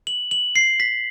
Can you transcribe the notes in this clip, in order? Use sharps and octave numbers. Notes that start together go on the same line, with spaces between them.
F#7
F#7
C7
B6